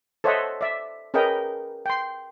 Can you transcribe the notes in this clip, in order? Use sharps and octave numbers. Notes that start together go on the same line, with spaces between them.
A4 C5 C#5 D#5 E5 F#5
D5 E5
C#4 G#4 A#4 B4 D#5 G5
G5 C6